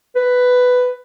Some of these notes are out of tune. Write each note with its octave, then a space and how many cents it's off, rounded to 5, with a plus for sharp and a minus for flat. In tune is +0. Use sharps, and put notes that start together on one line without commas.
B4 +10